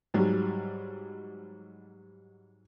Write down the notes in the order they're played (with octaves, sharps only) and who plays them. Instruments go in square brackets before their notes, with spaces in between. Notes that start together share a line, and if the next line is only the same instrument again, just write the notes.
[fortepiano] G#2 F#3 G3